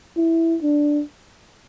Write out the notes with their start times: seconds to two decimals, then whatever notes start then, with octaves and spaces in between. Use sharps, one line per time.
0.17 E4
0.62 D4